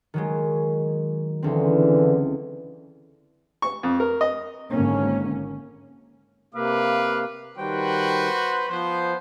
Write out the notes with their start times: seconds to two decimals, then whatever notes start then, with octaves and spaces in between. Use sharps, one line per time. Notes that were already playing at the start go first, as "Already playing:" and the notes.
0.14 D#3 F#3 G#3
1.43 C#2 D3 E3 C4
3.62 C#6
3.83 F2
4.00 A#4
4.21 D#5
4.70 G#1 G#2 D3 A#3 C#4
6.54 C3 A#3 B4 F5 D6
7.57 D#3 G3 F#4 B4 C5 G5
8.69 F3 B3 C5